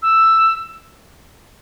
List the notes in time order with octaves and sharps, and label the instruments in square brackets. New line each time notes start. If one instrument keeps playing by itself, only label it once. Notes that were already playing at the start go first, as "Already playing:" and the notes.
[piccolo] E6